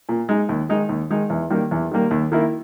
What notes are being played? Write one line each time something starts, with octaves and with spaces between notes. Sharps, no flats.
A#2
G#3 D#4
D#2
D#3 G#3 D#4
D#2
D#3 G#3 D#4
E2
D#3 G3 A#3
E2
D#3 G3 A#3
D#2
D#3 A#3 E4